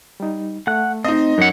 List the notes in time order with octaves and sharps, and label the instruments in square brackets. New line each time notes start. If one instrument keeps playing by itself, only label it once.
[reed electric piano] G3 D#4
[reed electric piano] A3 [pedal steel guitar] F#5 F#6
[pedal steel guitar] C4 [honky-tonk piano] D#4 D#5
[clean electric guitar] F#2 F#5